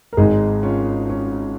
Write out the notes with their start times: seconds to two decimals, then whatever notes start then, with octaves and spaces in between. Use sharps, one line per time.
0.13 A#4
0.17 G#1 G#2 G#3 D#4 G#4
0.63 C#4 F4
1.09 C#4